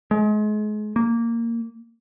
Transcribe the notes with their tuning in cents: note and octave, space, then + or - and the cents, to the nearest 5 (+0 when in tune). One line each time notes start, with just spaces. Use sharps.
G#3 +35
A#3 -10